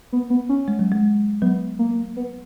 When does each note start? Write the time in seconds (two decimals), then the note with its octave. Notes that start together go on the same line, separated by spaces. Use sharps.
0.13 B3
0.30 B3
0.49 C#4
0.68 G#3
0.79 F#3
0.92 G#3
1.42 F#3 B3
1.79 A#3
2.17 B3